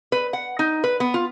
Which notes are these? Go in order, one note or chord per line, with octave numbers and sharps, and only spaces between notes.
B4
F#5
D#4
B4
B3
F4